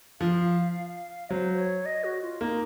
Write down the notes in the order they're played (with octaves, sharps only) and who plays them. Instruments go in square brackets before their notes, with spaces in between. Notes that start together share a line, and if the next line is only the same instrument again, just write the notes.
[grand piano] F3 [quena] F5
[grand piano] F#3 [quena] C5
[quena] C5
C#5
D#5
F#4
F4
[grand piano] A#3 [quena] D#4